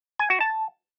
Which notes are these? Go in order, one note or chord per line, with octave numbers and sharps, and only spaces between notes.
G#5
F#4
A5